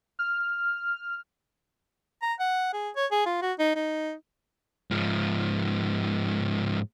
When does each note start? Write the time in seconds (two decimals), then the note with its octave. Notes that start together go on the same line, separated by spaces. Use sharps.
0.19 F6
2.22 A#5
2.40 F#5
2.73 G#4
2.96 C#5
3.12 G#4
3.26 F4
3.42 F#4
3.59 D#4
3.76 D#4
4.91 G#2 F3